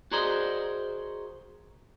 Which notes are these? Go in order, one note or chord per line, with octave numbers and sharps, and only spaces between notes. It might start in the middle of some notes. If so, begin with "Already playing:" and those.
F#4 G#4 A#4 C5 D5 D#5